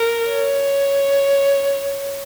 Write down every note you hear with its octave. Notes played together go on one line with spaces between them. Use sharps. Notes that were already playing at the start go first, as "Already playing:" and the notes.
Already playing: A#4
C#5